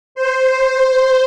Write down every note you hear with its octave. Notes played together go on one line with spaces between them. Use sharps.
C5